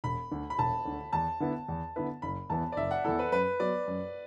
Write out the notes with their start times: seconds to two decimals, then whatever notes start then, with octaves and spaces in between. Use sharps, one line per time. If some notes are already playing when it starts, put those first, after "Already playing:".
0.04 E1 B5
0.31 D2 D3
0.50 B5
0.59 E1 A5
0.85 D2 D3
1.13 E2 A5
1.40 D3 B3 E4 B4
1.69 E2
1.96 D3 B3 E4 B4
2.22 F#1 B5
2.50 E2 E3 B3 E4 A5
2.72 D5
2.77 F#1 E5
2.91 F#5
3.04 E2 E3 B3 E4 A4
3.19 B4
3.32 F#2 B4
3.60 F#3 B3 D5
3.88 F#2